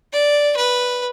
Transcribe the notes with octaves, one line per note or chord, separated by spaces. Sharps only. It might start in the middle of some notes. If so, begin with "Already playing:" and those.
D5
B4